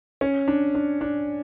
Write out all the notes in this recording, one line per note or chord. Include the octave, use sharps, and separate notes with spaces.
C#4
D4
D4
D4